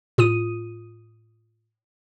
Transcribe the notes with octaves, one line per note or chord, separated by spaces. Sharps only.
A2 F4 D#6 D#7